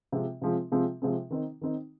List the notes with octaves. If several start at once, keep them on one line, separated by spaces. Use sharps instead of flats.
C3 F3 G#3 C4
C3 F3 G#3 C4
C3 F3 G#3 C4
C3 F3 G#3 C4
D#3 C4 D#4
D#3 C4 D#4